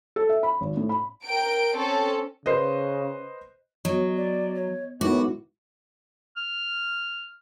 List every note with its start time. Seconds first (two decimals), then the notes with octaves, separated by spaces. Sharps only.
0.16 A4
0.29 E5
0.43 B5
0.61 G#1
0.77 A2
0.89 B5
1.26 A#4 G5 D7
1.76 C4 C#4 A4
2.46 C#3 B4 C5 D#5
3.85 F#3 B3 D#5
4.17 D5
4.55 C#5
5.01 F#2 A2 G#3 B3 D#4 E4 F#4 D6
6.37 F6